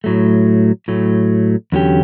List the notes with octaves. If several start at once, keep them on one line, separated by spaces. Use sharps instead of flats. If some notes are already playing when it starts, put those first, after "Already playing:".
A2 F#3 A3
A2 F#3 A3
E2 D3 F#3 C#4 G4